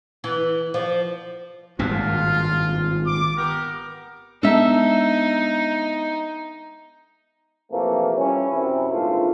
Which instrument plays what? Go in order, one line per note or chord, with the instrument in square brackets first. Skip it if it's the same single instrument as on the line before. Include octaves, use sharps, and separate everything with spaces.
[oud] E3
F3
[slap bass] G#1 G2 A#2 [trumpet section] F4
[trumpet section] D6
B3 G4 A#4
[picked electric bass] G#3 B3 D4 [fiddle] D#4 [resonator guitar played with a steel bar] A4 E5
[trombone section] C3 E3 F3 A3 A#3
G3 C#4 E4
F#2 C3 E4
G#1 G2 A#2 D3 A3 F4